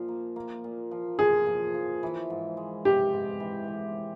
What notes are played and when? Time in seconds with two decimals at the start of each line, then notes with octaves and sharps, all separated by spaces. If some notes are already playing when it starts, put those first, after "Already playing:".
Already playing: A#2 F3
0.08 A#3
0.36 A#3
0.64 A#2
0.91 F3
1.19 F3 G#4
1.46 F3
1.75 F3
2.03 E3
2.30 G#2
2.57 G#3
2.85 C4 G4
3.13 G#2
3.40 E3
3.68 E3